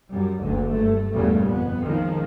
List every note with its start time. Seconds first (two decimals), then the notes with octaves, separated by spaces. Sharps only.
0.11 F#2 G3
0.43 F#1 D2 D3
0.73 G2 A3
1.13 E2 G2 A#2 C#3 G3 A3
1.45 G1 F2 B3
1.84 A#1 D#3 F3 G#3 C4